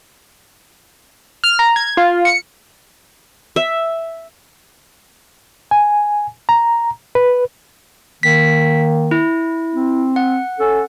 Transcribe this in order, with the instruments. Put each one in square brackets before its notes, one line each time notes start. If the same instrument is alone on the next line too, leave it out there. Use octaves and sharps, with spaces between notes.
[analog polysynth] F6
A#5
G#6
F4
C#7
[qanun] E5
[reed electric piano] G#5
A#5
B4
[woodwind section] D#3 A#3 [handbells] B6
[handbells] E4
[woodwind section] C4
[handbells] F#5
[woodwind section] C#4 A4